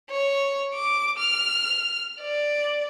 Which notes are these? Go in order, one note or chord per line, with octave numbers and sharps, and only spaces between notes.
C#5
D6
F6
D5